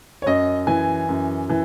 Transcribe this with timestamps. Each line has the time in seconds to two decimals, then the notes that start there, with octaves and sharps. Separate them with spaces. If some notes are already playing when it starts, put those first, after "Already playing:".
0.22 C#5
0.26 F#2 D#5
0.67 E3 G#5
1.09 F#2
1.50 E3